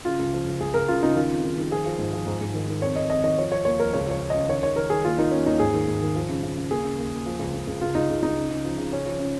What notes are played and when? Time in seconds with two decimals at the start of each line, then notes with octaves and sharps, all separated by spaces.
0.05 C#3 F4
0.19 C#2
0.33 F3
0.46 C#2
0.61 C#2 G#4
0.74 C#2 A#4
0.88 C#3 F4
1.02 C#3 D#4
1.15 D#3 F4
1.30 F2
1.44 D#3
1.57 D#3
1.71 F3 G#4
1.86 F3
1.99 G#2
2.13 F3
2.26 G#2
2.41 G#2
2.54 D#3
2.68 D#3
2.82 F2 C#5
2.96 F2 D#5
3.10 F2 D#5
3.24 D#3 D#5
3.38 F3 C#5
3.51 F3 C#5
3.65 D#2 C#5
3.79 F3 A#4
3.93 C#2 C#5
4.07 F3 C#5
4.22 F3
4.30 C#3 D#5
4.49 D#3 C#5
4.63 D#3 C#5
4.76 D#3 A#4
4.90 D#3 G#4
5.04 D#2 F4
5.18 D#3 D#4
5.31 D#2 C#4
5.45 D#2 D#4
5.60 G#2 G#4
5.74 D#3
5.88 G#2
6.01 D#3
6.16 F3
6.29 C#3
6.43 C#3
6.57 C#3
6.70 D#2 G#4
6.84 C#3
6.98 D#2
7.13 D#2
7.26 F3
7.39 C#2
7.54 C#2
7.67 C#2
7.81 C#2 F4
7.95 C#2 D#4
8.10 C#2
8.23 C#2 D#4
8.36 C#3
8.50 C#3
8.65 F3
8.78 C#3
8.93 C#3 C#4
9.06 F3
9.20 C#3